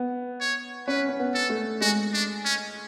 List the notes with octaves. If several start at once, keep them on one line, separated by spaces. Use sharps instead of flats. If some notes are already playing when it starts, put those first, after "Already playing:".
Already playing: B3
C#5
C#4 B4
C#4
B3
A4
A3
G#3 F#4
D4
C#4